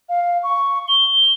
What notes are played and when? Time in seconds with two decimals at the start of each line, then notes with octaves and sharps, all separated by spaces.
0.09 F5
0.43 C#6
0.88 G7